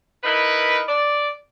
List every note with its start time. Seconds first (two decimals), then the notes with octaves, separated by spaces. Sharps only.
0.24 D#4 E4 A#4 B4
0.88 D5